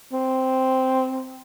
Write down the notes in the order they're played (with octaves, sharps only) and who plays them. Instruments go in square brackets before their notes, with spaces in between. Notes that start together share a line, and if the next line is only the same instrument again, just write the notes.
[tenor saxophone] C4